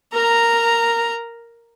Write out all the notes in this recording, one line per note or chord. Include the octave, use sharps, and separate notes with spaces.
A#4 A#5